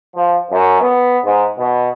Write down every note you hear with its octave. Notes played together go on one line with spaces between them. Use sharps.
F3
F#2
B3
G#2
B2